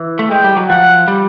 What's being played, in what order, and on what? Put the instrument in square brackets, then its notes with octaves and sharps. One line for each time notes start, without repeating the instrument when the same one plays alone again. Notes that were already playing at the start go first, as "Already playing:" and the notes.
Already playing: [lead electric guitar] E3
A3
[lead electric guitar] G#3 [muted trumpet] G5
[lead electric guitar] G3
F#3
[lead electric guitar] F3 [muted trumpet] F#5
[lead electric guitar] G3